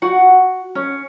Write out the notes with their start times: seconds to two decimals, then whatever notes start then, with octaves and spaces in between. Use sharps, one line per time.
0.02 F#4 F#5
0.75 C#4